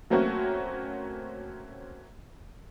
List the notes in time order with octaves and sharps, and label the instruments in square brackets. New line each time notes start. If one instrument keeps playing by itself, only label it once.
[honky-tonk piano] F#3 A3 A#3 C4 C#4 F#4